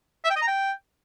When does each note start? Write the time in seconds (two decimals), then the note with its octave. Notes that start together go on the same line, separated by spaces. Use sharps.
0.24 E5
0.30 G5
0.36 D#5
0.42 A#5
0.47 G5